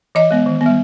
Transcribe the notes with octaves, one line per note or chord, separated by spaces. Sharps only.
E3 D#5
G#3 B3
D#3
B3
G3